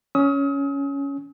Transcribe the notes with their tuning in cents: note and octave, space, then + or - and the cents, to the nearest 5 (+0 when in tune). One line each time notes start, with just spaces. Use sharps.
C#4 +10 D#6 +40